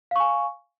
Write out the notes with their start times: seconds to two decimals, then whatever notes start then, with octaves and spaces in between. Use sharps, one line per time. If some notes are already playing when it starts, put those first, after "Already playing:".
0.11 F5
0.16 C#6
0.20 G#5